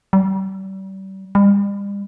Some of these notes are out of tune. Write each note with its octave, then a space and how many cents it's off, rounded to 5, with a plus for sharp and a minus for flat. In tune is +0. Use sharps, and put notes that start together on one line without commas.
G3 -35
G3 +40